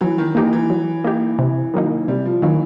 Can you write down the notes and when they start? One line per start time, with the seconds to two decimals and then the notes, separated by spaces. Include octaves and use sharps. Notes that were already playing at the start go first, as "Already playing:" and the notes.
0.01 E3 F#3
0.18 D#3
0.35 E3 A#3 D#4 G4
0.53 E3
0.70 F#3
1.04 A#3 D#4 G4
1.39 C3
1.74 D#3 F#3 A#3 D#4
2.08 C3 G3
2.25 F3
2.42 D#3 E3 F#3 A#3 D#4